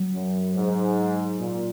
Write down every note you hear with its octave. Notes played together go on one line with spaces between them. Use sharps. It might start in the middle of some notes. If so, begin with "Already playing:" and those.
Already playing: F#3
F#2
G#2
A#2